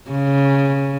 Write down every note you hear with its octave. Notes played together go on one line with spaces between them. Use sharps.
C#3